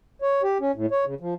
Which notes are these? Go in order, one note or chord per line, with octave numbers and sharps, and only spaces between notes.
C#5
G4
C#4
A2
C#5
C#3
F3